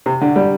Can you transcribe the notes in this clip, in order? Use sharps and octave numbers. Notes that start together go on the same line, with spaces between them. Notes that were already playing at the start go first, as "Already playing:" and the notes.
C3
D3
G3